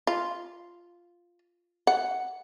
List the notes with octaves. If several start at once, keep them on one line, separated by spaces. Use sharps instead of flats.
F4
F#5